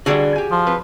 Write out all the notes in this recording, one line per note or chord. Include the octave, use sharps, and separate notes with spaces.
D3 G3 F#4 G#4 D5
G4 G#5
F3
C4 B4